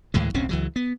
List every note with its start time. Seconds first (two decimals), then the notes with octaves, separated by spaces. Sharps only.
0.14 D2 A2 E3 G#3
0.34 D1 B1 C4 C#4
0.49 C#2 E3 F#3
0.76 B3